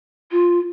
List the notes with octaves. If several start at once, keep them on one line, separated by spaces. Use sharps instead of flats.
F4